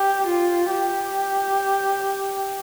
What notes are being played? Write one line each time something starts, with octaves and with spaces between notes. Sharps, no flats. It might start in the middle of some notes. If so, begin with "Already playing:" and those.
Already playing: G4
F4
G4